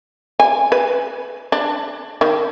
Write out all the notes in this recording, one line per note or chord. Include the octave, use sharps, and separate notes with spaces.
G#5
B4
D4
D#3